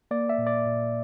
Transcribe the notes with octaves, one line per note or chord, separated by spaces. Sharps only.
A#3 D5
E5
A#2
D5
A#2